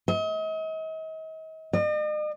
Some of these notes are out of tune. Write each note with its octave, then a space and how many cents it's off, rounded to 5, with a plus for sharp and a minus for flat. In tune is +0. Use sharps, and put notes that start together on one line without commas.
D#5 +40
D#5 -45